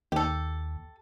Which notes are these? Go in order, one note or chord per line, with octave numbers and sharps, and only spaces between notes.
D#2 G4 A4